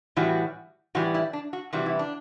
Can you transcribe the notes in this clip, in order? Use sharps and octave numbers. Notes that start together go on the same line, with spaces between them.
A2 E3 G3 F#4
A2 E3 G3 F#4
E4
D4
F#4
C3 E3 G3 F#4
E4
D4